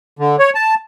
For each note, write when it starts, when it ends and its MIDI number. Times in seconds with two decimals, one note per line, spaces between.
0.19 0.36 50
0.39 0.50 73
0.55 0.75 81